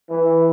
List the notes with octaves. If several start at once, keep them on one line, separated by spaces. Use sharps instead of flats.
E3